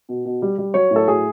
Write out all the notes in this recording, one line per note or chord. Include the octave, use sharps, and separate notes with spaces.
B2
B2
G3
G3
F#3 C#5
A2
A4
F#3 G#4